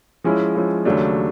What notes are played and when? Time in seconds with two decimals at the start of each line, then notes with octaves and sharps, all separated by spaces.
0.24 F3 G#3 C#4 E4
0.55 F3 G#3 C#4 E4
0.85 D#2 C#3 F#3 A3 D4